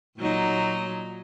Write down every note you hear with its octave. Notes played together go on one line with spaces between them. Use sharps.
A#2 F#3 D#4